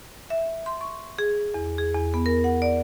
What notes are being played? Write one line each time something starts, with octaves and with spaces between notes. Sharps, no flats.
E5
C6
C#6
G#4
E2
G#4
E2
B3
A#4
F#5
D5